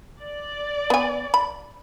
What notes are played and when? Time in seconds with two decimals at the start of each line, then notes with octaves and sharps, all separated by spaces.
0.22 D5
0.90 B3 G#5
1.34 B5